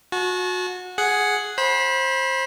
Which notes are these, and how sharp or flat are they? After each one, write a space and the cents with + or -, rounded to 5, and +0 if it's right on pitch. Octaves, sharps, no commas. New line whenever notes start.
F#4 -25 A5 -40
G#4 +5 F#5 +0
C5 +20 B5 -25